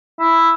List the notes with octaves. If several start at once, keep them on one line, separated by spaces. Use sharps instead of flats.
E4